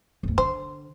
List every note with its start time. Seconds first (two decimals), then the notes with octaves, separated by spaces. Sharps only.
0.23 G1 D2
0.38 D3 C5